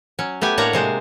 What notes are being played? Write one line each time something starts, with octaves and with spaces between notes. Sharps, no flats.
F#3 C#4
A3 B3 G4 G#5
A2 A#3 D4 C#5 F#5 A#5
C3 G#3 C5